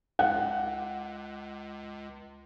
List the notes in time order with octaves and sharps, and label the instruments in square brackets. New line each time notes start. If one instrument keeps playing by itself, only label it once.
[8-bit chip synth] C#2 [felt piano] F#5